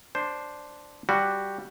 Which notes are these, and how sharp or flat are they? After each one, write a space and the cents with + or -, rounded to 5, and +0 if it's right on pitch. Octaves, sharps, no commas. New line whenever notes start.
D4 +0 C5 +0
G3 +0 F#4 +0